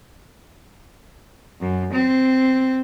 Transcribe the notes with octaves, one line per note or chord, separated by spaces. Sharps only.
F#2
C4